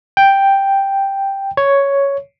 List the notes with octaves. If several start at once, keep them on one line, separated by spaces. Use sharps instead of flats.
G5
C#5